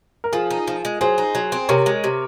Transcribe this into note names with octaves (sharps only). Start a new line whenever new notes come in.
A#4
F3 F4 G#4
D#4
F3
G#3
F#3 G#4 C5
D#4
F#3
C4
C3 A#4 C#5
G#3
C3